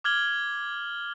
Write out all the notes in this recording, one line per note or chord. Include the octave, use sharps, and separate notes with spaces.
D6 F6 G#6 F#7 G7